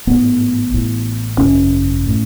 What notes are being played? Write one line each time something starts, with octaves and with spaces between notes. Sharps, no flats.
A1 G#2 B3
A1 A2
G#1 F#2 C#3 C#4
A2